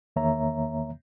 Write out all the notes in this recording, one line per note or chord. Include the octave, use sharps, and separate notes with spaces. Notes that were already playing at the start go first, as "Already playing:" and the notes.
E2 D#3 A#3 C#5 E5 A#5